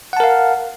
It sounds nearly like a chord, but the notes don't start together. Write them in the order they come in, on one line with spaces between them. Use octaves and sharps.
F#5 A5 A#4 F5